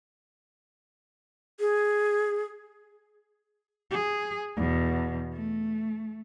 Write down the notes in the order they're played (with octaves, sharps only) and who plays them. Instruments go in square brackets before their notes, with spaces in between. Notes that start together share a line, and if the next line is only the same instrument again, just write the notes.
[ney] G#4
[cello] G#4
E2 B2
A3